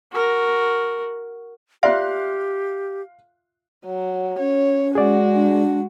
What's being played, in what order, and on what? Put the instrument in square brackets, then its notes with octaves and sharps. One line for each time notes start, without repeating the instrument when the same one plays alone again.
[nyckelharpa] F#4 A#4
[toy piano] F4 E5 [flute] G4 [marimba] D5 [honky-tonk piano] F5 C6 F#6
[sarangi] F#3
[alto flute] C#4 [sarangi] C#5
[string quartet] G#3 [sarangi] F#4 [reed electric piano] G#4 D5
[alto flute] D4